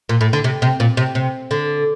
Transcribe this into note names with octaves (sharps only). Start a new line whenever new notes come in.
A#2
A2
D3
C3
C3
A#2
C3
C3
D3